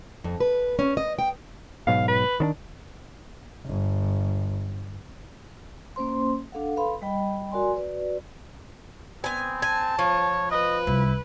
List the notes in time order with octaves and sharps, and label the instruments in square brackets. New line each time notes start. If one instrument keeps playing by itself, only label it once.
[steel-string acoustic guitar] F2
B4
C#4
D#5
G5
[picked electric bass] G#2 B2 F#3 [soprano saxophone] F5
[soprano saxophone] B4
[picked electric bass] D#3 C4 D4
[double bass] G1
[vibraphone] A#3 C#4 C5 C6
D4 A4 F5 F#5
A4 B4 F5 B5 C6
G3 D#5 G5 B5
F#4 A#4 D5 G#5 C6
F#4 B4 D5
[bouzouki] B3 G#5 [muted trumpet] C4
[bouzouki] G#5 [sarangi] A5
[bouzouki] F3 [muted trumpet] C#5
[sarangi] B4 [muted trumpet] D#5
[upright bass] C2 [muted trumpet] E4